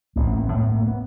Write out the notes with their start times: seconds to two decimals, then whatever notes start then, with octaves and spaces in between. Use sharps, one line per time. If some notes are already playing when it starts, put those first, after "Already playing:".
0.16 A1 A#3
0.27 B3
0.36 A#3
0.46 B3
0.53 A2 A#3
0.67 B3
0.77 A#3
0.87 B3